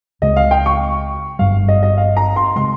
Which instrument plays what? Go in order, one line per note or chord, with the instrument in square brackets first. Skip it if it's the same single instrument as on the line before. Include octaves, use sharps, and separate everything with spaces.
[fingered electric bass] C#2 C#3 G#3 [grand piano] D#5
[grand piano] F5
G5
C#6
[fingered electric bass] G1 G2 G3 [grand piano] F5
[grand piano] D#5
D#5
F5
A#5
C6
[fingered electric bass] C#3 G#3 [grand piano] C6